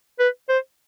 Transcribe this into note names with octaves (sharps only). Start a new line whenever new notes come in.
B4
C5